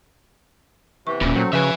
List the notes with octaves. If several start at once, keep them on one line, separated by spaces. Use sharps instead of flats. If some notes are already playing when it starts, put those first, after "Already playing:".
C3 E3 B3 C#6
D1 A#2 C#4 B5
F#3 A3 C4
C#3 F3 F#4 B4 E5 G#5